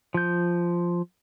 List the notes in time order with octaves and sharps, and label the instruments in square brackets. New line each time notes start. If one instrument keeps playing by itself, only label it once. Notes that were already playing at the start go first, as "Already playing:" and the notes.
[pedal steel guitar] F3 G6